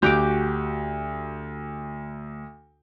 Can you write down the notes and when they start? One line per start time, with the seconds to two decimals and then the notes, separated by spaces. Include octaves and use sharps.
0.02 D2 F#4 G4 D6 G6 F7